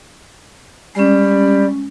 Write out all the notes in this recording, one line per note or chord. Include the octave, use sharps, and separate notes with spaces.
G3 G#3 C#4